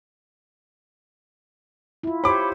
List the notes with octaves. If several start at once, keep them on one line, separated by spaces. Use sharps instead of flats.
E4 F4
G4 C5 C#5 B5 D6